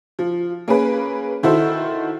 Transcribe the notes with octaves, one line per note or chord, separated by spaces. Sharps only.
F3
A#3 C#4 G#4 B4
D#3 E4 F#4 A4 C5